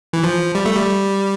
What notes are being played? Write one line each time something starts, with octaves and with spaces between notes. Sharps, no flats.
E3
F3
G3
A3
G3